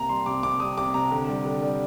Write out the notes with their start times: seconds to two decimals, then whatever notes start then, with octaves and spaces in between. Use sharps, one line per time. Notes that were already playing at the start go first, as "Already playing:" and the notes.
Already playing: C3 A#3 A#5
0.09 G3 C6
0.26 C3 D6
0.43 C3 D6
0.60 G3 D#6
0.78 C3 D6
0.94 C3 A#5
1.11 D3
1.28 G3
1.45 D3
1.63 G3